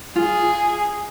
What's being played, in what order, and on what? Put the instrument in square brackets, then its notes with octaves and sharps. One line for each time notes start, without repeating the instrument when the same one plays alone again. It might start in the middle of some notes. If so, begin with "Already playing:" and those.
[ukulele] F4 [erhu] G#4